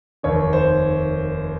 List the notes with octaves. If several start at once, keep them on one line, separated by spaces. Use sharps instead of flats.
F1 D#2 D#3 C#5
C5